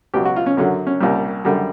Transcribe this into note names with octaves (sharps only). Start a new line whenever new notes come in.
C#2 B2 F#3 G4
F#4
F4
C#4
F#2 D3 F#3 C#4
C#4
C2 A#2 G3
F#2 D3 G3